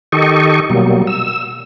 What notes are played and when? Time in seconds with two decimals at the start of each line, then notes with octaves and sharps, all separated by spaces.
0.12 D#3 G4 A4 D#5 C#6
0.70 B2 F#3 G3 A#3
1.07 E6